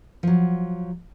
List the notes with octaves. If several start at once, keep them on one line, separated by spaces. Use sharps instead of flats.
F3 F#3